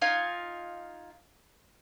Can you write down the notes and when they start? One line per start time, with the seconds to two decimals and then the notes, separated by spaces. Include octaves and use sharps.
0.01 D#4 F4 F5 G#5